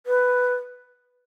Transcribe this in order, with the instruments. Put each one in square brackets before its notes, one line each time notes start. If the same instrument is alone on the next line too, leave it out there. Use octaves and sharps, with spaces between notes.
[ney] B4